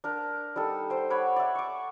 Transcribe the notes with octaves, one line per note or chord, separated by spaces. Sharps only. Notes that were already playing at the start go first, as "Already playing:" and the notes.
D4 A#4
G3 D#4 A4
C5 G5
C#5 F#5 B5 D6
D5 E5
C#6 D6